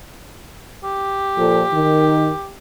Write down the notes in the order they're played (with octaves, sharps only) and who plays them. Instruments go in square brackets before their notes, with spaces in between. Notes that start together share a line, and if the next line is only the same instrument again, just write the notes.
[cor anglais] G4
[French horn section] A#2 F3 A4
D#3